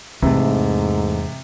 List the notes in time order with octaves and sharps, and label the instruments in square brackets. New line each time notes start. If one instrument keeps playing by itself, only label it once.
[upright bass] E2 [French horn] G#2 [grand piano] C3 [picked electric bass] E3 A3